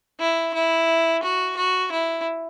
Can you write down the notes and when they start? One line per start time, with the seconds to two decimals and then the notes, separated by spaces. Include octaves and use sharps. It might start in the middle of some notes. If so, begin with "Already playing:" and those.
0.19 E4
0.54 E4
1.23 F#4
1.57 F#4
1.92 E4